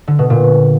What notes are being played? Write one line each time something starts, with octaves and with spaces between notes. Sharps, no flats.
D3
B2
A#2